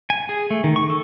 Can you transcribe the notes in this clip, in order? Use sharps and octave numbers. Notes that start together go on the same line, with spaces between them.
G#5
G#4
A3
D#3
C#6
A4